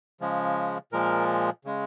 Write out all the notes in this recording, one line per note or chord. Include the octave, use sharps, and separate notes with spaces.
C#3 F3 G#3
A#2 F3 G#3 A#4
C#3 G#3